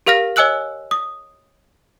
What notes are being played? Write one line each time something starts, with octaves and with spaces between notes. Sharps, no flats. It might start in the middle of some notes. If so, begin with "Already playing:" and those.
G4 A#4 F5 F6 A#6
C#5 D#5 G#5 E6 F#6 F#7
D#6